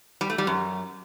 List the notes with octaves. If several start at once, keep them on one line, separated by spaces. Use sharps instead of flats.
G3
A3
G3
F#2